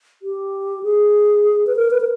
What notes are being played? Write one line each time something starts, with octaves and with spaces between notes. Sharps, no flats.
G4
G#4
B4
A#4
B4
A#4